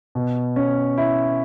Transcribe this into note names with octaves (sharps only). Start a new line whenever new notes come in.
B2
C#4
E4